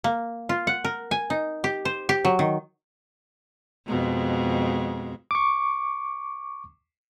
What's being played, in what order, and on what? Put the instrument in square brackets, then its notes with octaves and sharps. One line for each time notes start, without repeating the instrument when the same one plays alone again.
[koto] A#3
F4
F#5
A#4
G#5
D#4
G4
C5
G4
F#3
D#3
[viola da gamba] F2 B2 G#3
[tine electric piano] C#6 D6